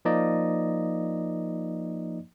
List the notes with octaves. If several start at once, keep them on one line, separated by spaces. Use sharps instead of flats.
F3 A#3 D#4 D5 D#5